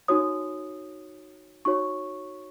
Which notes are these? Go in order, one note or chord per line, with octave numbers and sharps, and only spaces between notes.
D#4 F#4 C#5 D#6
D#4 F#4 C#5 C#6